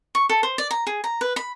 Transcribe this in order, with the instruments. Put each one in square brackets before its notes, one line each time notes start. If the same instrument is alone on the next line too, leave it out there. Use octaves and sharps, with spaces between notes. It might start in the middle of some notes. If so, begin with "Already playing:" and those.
[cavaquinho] C#6
A4
C5
D5
A#5
G#4
A#5
B4
B5